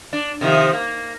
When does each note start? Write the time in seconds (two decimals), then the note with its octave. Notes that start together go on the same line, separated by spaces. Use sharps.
0.13 D4
0.41 C3 D#3 F3
0.73 A#3